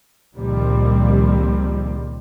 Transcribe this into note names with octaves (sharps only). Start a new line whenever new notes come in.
C#2 A#2 D#3 F3 G3 C4